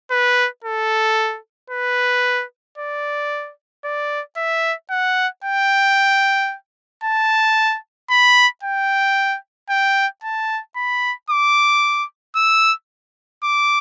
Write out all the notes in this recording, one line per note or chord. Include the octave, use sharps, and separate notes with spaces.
B4
A4
B4
D5
D5
E5
F#5
G5
A5
B5
G5
G5
A5
B5
D6
E6
D6